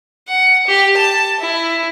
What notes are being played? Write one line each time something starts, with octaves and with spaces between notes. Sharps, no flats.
F#5
G4
A5
E4